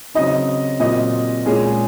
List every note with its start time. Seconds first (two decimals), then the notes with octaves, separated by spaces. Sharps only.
0.15 C#3 F#3 C4 D#4 D#5
0.80 A#2 F#3 C4 D#5
1.46 A#2 G#3 C#4 G#4